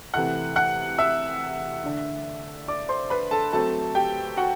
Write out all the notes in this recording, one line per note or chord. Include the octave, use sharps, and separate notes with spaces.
C3 E3 A3 E4 F#5 F#6
F#5 F#6
E5 E6
D3 A3 D4
D5 D6
C5 C6
B4 B5
A4 A5
F#3 A3 C4 A4 A5
G4 G5
F#4 F#5